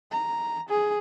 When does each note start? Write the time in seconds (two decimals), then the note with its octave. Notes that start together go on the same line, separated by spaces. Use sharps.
0.11 A#5
0.69 G#4